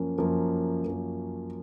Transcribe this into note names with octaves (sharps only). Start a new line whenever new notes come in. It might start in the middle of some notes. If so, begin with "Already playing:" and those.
Already playing: F#2 F3 A#3 C#4
F#2 F3 A#3 C#4
F#2 F3 A#3 C#4